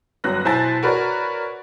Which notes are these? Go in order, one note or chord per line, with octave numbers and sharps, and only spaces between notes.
G1 G2 F#3 F#6 A#6
B2 E4 C5 G#5 A5 A6
F#4 A#4 B4 C#5 D5